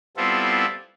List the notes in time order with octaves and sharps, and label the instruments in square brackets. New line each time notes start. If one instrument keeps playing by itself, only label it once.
[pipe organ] G3 B3 C4 E4 F4 A4